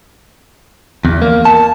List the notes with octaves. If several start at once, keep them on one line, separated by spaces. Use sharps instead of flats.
E2
A#3
A5